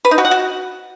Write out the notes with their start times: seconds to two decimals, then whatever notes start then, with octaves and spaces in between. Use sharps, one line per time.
0.05 B4
0.11 D#4
0.18 F#4
0.25 F#5
0.31 F#4